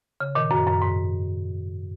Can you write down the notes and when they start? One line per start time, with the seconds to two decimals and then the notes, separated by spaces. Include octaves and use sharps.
0.20 C#3
0.35 A#2 D#3
0.51 F#2
0.67 F#2
0.82 G#2